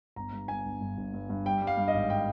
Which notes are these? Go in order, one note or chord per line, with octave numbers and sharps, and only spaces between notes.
G1 A#5
G2
G1 G#5
G1
G2
G1
G2
G2
G3 G5
G3
F5
G2
D#5
G#1
G5